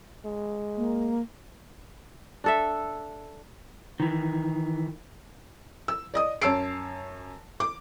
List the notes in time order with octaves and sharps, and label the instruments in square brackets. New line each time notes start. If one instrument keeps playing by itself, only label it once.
[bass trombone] G#3
[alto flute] A#3
[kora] D4 A4 E5
[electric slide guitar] D#3 E3
[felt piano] E6
D5 D#5 D#6
F#2 C#5 A5 E6 C7 D7
D6